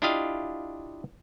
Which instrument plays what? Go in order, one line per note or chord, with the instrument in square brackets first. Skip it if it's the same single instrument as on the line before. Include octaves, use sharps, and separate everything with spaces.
[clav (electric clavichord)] D4 E4 F4 G4 D#5 F5